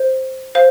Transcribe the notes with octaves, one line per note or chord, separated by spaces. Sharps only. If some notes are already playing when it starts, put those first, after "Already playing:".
Already playing: C5
C5 F5